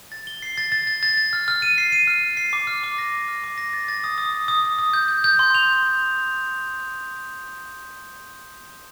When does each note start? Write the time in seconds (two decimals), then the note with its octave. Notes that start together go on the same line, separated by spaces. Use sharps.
0.12 A6
0.27 G7
0.42 C7
0.58 A6
0.72 A6
0.87 A6
1.03 A6
1.17 A6
1.33 F6
1.48 F6
1.62 D#7
1.78 C7
1.92 D#7
2.07 F6
2.23 D#7
2.37 C7
2.53 D6
2.67 F6
2.83 D6
2.98 A#6
3.13 D6
3.28 F6
3.44 D6
3.58 A#6
3.73 A6
3.88 A6
4.04 D#6
4.18 D#6
4.33 D#6
4.48 D#6
4.64 D#6
4.79 D#6
4.93 G6
5.08 G6
5.24 G6
5.39 C6
5.55 F7